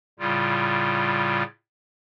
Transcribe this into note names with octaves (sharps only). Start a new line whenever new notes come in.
A2 C#3 G3 F4